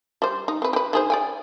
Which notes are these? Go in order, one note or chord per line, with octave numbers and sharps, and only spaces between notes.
G3 C5
D#4
C4 B4
G4 B4
D#3 G#4 C5
D5 G5 G#5